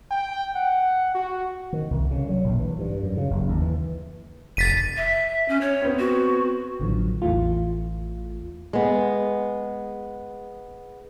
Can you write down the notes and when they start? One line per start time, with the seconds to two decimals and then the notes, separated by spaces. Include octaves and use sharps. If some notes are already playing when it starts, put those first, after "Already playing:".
0.11 G5
0.55 F#5
1.15 F#4
1.73 D#3
1.91 C2
2.11 C#3
2.29 F#3
2.44 A#1
2.59 E3
2.79 G2
3.03 F#2
3.17 C#3
3.30 F#1
3.49 D#2
3.62 E3
4.57 F1 A6 B6 D#7
4.97 E5
5.48 C#4
5.61 C#5
5.82 B3 C4
5.99 F#4
6.80 A1 D3 D#3 F3 F#3
7.22 A1 E2 E3 A3 F4
8.73 G#3 B3